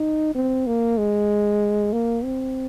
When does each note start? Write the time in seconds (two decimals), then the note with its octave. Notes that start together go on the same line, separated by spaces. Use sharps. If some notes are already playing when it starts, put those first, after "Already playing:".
Already playing: D#4
0.35 C4
0.67 A#3
0.98 G#3
1.93 A#3
2.24 C4